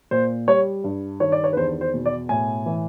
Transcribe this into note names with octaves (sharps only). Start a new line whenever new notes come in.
A#2 C5
G3 C#5
G2
D#3 C#5
D5
C#5
B4
E2 C5
C5
B2
D5
A2 G#5
E3